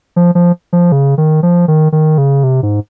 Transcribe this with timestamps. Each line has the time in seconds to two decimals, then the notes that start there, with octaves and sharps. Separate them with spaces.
0.16 F3
0.35 F3
0.73 F3
0.92 C#3
1.18 D#3
1.43 F3
1.68 D#3
1.92 D#3
2.18 C#3
2.44 C3
2.63 G#2